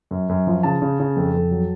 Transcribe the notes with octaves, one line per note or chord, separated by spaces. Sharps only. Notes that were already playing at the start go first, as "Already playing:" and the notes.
F#2
F#2
F3
C#3 A5
C#3
C#3
F2
F2
F#3